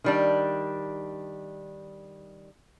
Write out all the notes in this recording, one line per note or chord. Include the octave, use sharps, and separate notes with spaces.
D#3 G3 D4